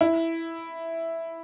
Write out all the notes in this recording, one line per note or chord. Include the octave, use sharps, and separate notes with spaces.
E4